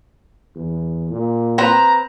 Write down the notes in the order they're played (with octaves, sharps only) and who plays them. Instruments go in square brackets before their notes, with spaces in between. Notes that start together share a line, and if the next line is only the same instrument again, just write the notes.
[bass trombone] E2
A#2
[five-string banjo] C4 B4 [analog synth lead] A#5